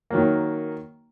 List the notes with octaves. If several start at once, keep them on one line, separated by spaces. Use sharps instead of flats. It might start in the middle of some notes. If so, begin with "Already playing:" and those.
D#3 F#3 A#3